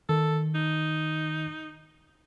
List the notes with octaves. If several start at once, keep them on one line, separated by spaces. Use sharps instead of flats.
D#3 A4
D#4